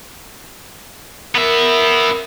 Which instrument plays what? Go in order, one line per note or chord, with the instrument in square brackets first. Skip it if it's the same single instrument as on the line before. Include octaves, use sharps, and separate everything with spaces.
[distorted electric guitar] B3 E5 [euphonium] A#4